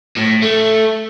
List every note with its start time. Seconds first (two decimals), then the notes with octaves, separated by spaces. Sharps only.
0.17 A2
0.43 A3